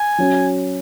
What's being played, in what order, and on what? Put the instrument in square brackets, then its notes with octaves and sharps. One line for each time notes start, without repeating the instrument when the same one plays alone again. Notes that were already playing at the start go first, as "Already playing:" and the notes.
Already playing: [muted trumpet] G#5
[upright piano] F#3 C#4 F#4